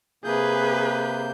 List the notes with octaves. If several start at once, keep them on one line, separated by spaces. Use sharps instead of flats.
C3 A#3 G#4 B4 G6